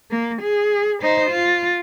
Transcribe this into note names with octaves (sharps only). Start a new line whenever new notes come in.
A#3
G#4
D#4 C5
F4